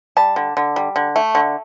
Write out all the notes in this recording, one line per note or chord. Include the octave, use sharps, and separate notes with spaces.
G3 A5
D3
D3
G3
D3
A3
D3